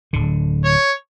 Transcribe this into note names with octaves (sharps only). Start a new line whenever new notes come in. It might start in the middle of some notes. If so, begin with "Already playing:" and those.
D1 D3
C#5